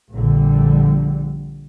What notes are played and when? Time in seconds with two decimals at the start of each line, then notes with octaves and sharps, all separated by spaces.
0.13 A#1 D3 G3